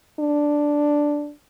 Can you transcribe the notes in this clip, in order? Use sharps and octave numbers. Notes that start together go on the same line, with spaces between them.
D4